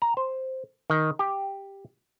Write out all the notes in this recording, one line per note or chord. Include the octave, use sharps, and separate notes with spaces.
A#5
C5
D#3
G4